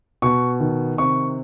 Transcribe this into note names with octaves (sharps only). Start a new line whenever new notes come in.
B2 C#6
D#3
C3 C#6